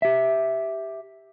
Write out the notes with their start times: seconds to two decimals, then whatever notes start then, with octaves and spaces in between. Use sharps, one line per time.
0.02 G4 E5